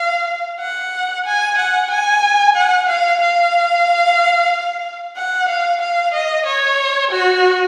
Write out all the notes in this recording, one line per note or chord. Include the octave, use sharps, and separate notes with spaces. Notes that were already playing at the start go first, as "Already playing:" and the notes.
Already playing: F5
F#5
G#5
F#5
G#5
F#5
F5
F5
F#5
F5
F5
D#5
C#5
F#4